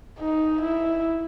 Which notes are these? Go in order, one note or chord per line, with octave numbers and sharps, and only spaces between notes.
D#4
E4